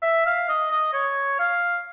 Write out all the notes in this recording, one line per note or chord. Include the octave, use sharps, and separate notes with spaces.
E5
F5
D#5
D#5
C#5
F5